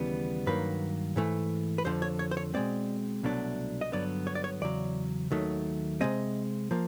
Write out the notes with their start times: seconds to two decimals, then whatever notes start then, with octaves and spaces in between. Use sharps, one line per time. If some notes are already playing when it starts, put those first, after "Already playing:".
Already playing: D#2 C#3 E3 G3 B3
0.46 G2 D#3 F#3 A#3 B4
1.16 G#2 E3 A3
1.78 B4
1.85 F2 D3 F3 C5
2.02 C#5
2.19 C#5
2.31 C5
2.37 C#5
2.54 B2 G#3 C4 D5
3.23 C2 B2 F#3 A3 D4
3.81 D#5
3.92 G2 D3 F#3 B3 D5
4.27 C#5
4.35 D5
4.44 C#5
4.62 E2 C#3 F#3 D5
5.31 D#2 D#3 F#3 A3
6.01 C3 E3 G#3 C4 D#5
6.71 F3 A#3